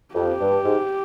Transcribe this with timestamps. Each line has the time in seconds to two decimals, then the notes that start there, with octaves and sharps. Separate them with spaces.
0.15 F2 G4
0.40 G2
0.64 G#2